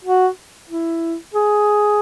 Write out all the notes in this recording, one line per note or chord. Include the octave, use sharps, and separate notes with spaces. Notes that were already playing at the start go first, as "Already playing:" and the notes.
F#4
E4
G#4